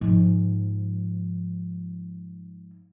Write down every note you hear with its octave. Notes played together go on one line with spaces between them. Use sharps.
G#2 F3